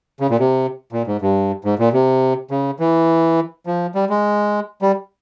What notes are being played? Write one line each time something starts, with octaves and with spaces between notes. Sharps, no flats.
C#3
A#2
C3
A#2
G#2
G2
G#2
A#2
C3
C#3
E3
F3
G3
G#3
G3